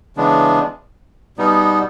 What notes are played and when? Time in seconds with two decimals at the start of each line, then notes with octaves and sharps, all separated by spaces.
0.16 C#3 E3 G#3 B3 D4
1.37 B2 G3 B3 D#4